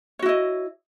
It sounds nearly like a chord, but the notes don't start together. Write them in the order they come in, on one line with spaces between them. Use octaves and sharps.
C#5 F#4 E4 D#5